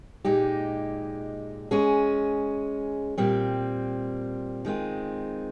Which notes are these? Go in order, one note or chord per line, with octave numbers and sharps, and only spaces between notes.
A#2 G#3 D#4 G4
G#3 C#4 G#4
A#2 G3 C4
D#3 G#3 C4 F4